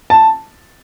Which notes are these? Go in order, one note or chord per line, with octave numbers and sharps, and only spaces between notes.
A5